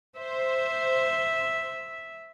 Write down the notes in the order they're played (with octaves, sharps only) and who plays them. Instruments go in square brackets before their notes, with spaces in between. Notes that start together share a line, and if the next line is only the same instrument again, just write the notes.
[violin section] C5 [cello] E5